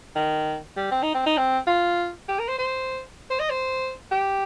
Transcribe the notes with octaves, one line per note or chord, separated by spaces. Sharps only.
D#3
G3
C4
D#4
C4
D#4
C4
F4
G4
A#4
C5
C5
C5
D#5
C5
G4